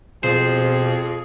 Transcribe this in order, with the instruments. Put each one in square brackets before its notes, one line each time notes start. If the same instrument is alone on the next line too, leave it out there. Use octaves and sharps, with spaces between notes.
[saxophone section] F2 F3 G#4 [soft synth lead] B2 [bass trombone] C4 [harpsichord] C5